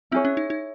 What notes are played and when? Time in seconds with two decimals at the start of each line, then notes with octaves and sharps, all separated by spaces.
0.11 C4 E4 G#4 C#5
0.25 C#4
0.37 D#4
0.50 D#4